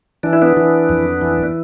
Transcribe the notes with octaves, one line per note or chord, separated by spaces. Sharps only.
E3 D4
E4
B3 D4
E3
F2
E3